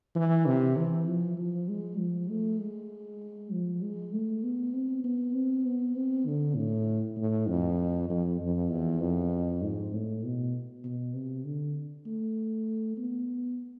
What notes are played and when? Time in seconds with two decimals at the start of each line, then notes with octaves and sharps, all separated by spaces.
0.15 E3
0.46 C3
0.77 E3
1.07 F3
1.38 F3
1.69 G#3
1.99 F3
2.30 A3
2.60 G#3
3.52 F3
3.82 G#3
4.13 A3
4.43 B3
4.74 C4
5.04 B3
5.34 C4
5.66 B3
5.96 C4
6.26 D3
6.56 A2
7.17 A2
7.48 F2
8.10 F2
8.40 F2
8.70 E2
9.01 F2
9.62 G#2
9.93 A2
10.23 B2
10.84 B2
11.14 C3
11.45 D3
12.06 A3
12.98 B3